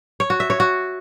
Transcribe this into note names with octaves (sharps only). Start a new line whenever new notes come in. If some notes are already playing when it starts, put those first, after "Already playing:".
C#5
F#4
E5
C#5
F#4